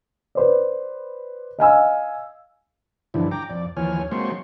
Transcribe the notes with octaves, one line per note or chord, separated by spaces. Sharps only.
B4 C5 D5
D#5 F5 G#5 E6
G2 D3 E3 F3 D4 E4
G5 A#5 D6
F2 D5
D#2 E3 F3 C#5 G#5 F6
F#3 G#3 A#3 C4 C6 C#6